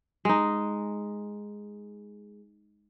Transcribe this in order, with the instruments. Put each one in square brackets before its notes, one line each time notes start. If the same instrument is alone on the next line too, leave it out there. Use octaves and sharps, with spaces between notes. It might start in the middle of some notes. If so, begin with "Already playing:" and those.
[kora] G#3 D#4